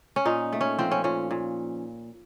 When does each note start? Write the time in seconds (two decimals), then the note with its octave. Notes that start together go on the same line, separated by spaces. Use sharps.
0.16 C#4
0.25 A#2 D#4
0.53 A3
0.61 C#4
0.79 F3 C4
0.91 C#4
1.04 A#2 C#4
1.31 A#2